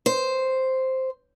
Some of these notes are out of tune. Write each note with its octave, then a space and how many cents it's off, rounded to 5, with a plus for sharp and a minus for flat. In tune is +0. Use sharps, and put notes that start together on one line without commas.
C5 +0